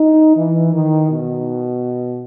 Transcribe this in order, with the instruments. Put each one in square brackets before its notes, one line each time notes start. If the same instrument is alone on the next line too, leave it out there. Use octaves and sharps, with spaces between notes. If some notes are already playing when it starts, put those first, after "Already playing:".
Already playing: [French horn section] D#4
E3
D#3
B2